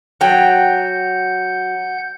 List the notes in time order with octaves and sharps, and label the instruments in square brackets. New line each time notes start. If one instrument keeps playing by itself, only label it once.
[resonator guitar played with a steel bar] F#3 G5 [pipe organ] F#5 G6